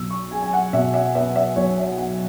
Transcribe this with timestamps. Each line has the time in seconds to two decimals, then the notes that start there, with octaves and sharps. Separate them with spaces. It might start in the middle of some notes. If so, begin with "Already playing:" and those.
Already playing: B1 E6
0.10 C#6
0.31 G#3 G#5
0.42 G#5
0.53 F#5
0.73 B2 E5
0.94 E5
1.15 B3 E5
1.36 E5
1.56 B1 C#5
1.78 E5
1.98 B3 F#5